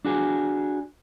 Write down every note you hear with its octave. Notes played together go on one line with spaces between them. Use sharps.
D4 F#4 G#4